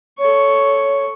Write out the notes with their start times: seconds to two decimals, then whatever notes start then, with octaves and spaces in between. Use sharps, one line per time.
0.19 A4 C#5 C#6